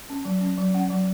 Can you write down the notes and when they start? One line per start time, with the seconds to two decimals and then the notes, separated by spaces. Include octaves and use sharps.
0.10 C#4
0.25 F#3
0.41 C#4
0.58 F#3
0.74 C#4 F#5
0.90 F#3